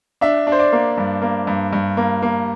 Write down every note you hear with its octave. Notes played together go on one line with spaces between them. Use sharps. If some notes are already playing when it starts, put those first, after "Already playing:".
D4 E5
D4
C5
D5
A#3
G2
A#3
G2
G2
A#3
A#3